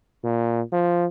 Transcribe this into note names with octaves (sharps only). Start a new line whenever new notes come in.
A#2
F3